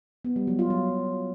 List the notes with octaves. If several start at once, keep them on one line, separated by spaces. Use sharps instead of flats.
B3
G3
F#3
F4
F#3